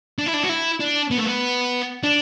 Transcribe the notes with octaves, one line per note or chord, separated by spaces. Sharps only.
D4
E4
D4
F#4
E4
D4
B3
A3
B3
D4